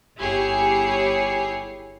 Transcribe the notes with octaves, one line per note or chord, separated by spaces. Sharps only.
G1 E4 G4 G#4 C#5 C7